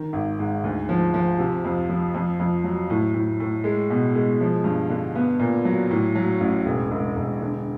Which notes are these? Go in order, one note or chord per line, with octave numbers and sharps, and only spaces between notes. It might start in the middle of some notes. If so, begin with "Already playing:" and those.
Already playing: D#3
G#1
G#2
D2
F3
F3
C3
F2
F3
F2
F2
F#3
A2
A2
A2
G#3
B2
G#3
F3
G2
D3
B3
A#2
F#3
A2
F#3
A1
E1
E1
E1
D3